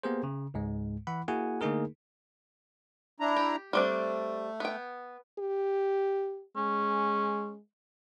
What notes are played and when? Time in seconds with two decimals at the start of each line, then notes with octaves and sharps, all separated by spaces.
0.03 A#3 B3 G4 G#4 A#4 C5
0.23 C#3
0.54 C#2 G#2 G#3
1.07 E3 E4 F#5 B5
1.28 A#3 E4 F#4 G#4 F#5 G#5
1.61 D3 A3 A#3 D#4 G#4 A#4
3.20 D4 E4 A#5
3.37 G4
3.73 G3 A3 C4 D4
4.60 B3 G5
5.39 G4
6.56 G#3 C#4